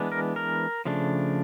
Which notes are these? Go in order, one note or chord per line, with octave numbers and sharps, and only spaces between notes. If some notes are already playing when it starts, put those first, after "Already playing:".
Already playing: E3 G#3 B3 D4
A#4
A#4
C#3 F3 A3 D4